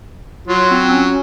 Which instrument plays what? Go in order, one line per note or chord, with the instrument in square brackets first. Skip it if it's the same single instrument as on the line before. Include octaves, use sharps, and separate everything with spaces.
[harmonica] F#3 [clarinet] F4
[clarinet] C4
C#4